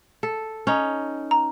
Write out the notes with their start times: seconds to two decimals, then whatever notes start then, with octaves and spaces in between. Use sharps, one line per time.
0.23 A4
0.67 C#4 D#4
1.31 A#5